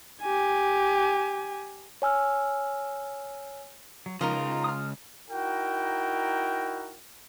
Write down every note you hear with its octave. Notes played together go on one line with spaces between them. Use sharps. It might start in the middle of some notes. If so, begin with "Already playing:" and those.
G4 G#5
C#5 G#5 E6 F6
F#3
C#2 C#3 F3 D#4 F4 A#4 D#5
A#5
D#6 F6
D#4 E4 F#4 A#4 G5